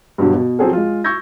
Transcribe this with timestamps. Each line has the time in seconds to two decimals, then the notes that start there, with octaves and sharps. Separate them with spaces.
0.18 G2 B2 D3 F#3
0.34 B2
0.59 F3 F#3 C4 G#4 A4
0.73 G#3 F4
1.04 C#6 E6 G6 G#6 A#6